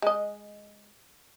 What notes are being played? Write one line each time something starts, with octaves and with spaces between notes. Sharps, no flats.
G#3 D#5